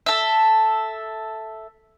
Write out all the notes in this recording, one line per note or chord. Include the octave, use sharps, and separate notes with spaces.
A4 E5